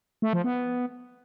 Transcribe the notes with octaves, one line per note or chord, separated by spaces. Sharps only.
A3
F3
B3